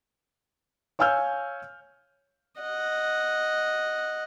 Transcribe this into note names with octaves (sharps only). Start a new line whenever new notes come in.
C#5 F5 G#5 E6 F6 G6
D#5 F#5